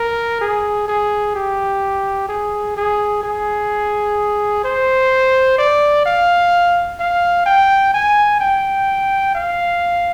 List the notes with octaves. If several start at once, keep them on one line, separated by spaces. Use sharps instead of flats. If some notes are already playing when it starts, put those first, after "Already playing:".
Already playing: A#4
G#4
G#4
G4
G#4
G#4
G#4
C5
D5
F5
F5
G5
G#5
G5
F5